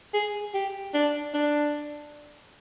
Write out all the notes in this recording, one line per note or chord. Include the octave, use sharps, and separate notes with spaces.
G#4
G4
D4
D4